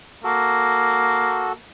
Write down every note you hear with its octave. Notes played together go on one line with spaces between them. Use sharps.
A#3 F#4 A4